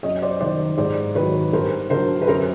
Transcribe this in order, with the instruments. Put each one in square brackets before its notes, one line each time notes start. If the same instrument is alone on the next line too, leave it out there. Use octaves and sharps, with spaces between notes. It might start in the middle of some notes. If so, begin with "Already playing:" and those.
[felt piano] F#2 C#5 D#5
C5 D5
D#3 G3 C5 D5
G#2 C5 D5
D#3 F#3 B4 C#5
G2 A#4 C5
D3 F#3 A#4 C5
B4
F#2 A#4 C5